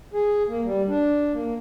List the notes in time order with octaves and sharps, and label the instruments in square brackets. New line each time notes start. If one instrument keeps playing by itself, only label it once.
[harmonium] G#4
A#3
G3
D4
A#3